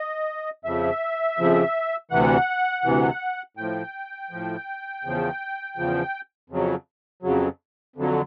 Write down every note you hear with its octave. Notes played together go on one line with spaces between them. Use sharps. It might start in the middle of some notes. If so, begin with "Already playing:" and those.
Already playing: D#5
F2 C#3 F3 E5
F2 C#3 F3
D2 C3 E3 F#5
D2 C3 E3
A2 F3 G5
A2 F3
E2 C#3 F3
E2 C#3 F3
F2 C#3 F#3
F2 C#3 F#3
F2 D3 F#3